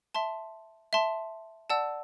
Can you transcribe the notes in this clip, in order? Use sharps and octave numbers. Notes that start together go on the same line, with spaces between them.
E5 A5 C6
E5 A5 C6
D5 F#5 A5 E6